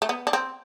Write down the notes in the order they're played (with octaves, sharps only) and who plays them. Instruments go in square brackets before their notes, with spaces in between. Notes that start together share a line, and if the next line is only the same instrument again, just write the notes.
[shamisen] A3
B3
D4
C4